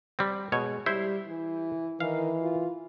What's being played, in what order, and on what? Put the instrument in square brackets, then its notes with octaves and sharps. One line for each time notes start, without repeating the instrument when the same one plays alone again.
[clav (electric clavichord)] G3 C4
[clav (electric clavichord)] B2 C#5 [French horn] G#3
[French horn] G3 [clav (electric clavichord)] E4 C5 E5
[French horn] E3
[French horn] D#3 [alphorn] E3 [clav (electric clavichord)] F5
[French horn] F4